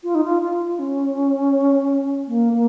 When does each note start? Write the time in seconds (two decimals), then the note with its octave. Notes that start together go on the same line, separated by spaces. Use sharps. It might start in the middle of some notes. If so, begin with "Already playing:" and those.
0.04 F4
0.15 D#4
0.24 F4
0.42 F4
0.79 C#4
2.28 A#3
2.53 A#3